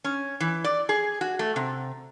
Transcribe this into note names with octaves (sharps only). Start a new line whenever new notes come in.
C#4
E3
D5
G#4
F#4
A3
C3